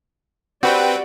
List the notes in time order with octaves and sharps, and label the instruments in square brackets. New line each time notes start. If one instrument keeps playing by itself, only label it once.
[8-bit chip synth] C4 B4 G5 [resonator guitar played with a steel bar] F#4 [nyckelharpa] G4 D5